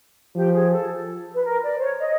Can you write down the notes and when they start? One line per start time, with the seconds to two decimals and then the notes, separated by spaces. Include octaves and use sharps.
0.35 F3 G4
0.54 G#4
0.72 A4
1.34 B4
1.45 A#4
1.63 D5
1.77 C5
1.80 C#5
1.99 D#5